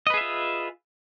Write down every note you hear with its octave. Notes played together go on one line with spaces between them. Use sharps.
F4 G#4 B4 D#5 E5